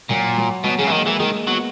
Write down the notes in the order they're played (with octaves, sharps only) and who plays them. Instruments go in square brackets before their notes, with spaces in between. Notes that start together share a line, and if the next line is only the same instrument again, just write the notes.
[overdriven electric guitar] A#2 [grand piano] F#3
[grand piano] F#3
[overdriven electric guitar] B2 [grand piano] F#3
[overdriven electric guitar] C#3 [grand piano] G#3
[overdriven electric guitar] E3
[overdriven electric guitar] D#3 [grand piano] A#3
[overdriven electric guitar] E3 [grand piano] G#3
[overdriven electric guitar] D#3 [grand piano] G#3
[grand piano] A#3
[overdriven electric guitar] F#3 [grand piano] B3